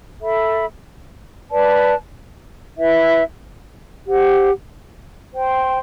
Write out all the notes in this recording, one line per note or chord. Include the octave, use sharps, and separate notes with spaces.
A4 E5 B5
B4 D5 A5
E4 B4 E5
G4 C5 F#5
C5 G5 C6